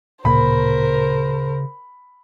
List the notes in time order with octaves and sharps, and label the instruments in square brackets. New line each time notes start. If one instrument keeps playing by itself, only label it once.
[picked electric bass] D1 A#2 A#3 [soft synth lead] C#3 [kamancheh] A#4 C5 [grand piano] B5